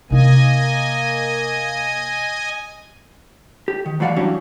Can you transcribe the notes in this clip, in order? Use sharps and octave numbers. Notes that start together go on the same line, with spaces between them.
C3 A#3 D#4 D#5 G#5
G4
D#3
A2 E3 F#3 F#4 D5 F5
G2 E3 F#3 G3 C#4 D4